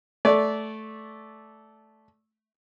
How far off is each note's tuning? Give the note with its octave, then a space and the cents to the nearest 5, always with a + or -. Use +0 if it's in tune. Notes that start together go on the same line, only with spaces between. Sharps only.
A3 -10 D5 -20